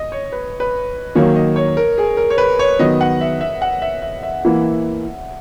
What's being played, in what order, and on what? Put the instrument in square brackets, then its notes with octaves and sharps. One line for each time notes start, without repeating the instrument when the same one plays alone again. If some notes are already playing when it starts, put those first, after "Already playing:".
Already playing: [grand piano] D#5
C#5
B4
B4
[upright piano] D#3 F#3 A#3 [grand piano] C#5
[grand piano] D#5
C#5
A#4
G#4
A#4
C#5
B4
C#5
[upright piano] D#3 F#3 B3 [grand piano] D#5
[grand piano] F#5
E5
E5
F#5
E5
E5
E5
[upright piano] E3 A#3 E4